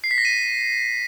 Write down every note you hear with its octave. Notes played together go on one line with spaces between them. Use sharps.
C7
B6
A#6
D#7